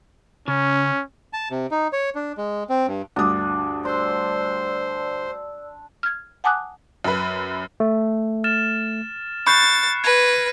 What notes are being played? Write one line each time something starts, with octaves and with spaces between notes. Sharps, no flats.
C#3 C#4
A5
C3
D#4
C#5
D4
G#3
C4
G2
D2 G2 D4 D#6
C5 D5 C6 E6
F6 G#6
F#5 G#5 A5 D6 D#6 F#6
F#2 B4
A3
F6 A6 E7
B5 C#6 F#6 G6 A6 C7 C#7
B4 G#6 A#6